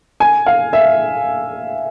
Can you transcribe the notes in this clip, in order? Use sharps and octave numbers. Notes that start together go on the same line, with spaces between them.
G#5
F5
E5